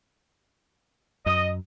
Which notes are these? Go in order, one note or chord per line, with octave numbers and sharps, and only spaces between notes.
F#2 D#5